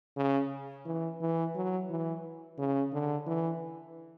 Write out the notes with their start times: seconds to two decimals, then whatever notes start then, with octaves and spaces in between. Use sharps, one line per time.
0.16 C#3
0.86 E3
1.21 E3
1.55 F#3
1.90 E3
2.58 C#3
2.92 D3
3.27 E3